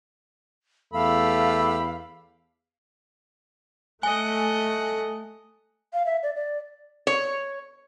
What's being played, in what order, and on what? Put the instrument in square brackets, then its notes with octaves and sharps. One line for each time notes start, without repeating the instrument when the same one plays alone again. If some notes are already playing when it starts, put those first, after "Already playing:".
[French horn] E2 [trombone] A3 [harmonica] G4 B5 E6 [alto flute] F5
[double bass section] A3 [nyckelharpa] D#5 F#5 [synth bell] G#5
[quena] F5
E5
D5
D5
[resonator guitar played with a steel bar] C#5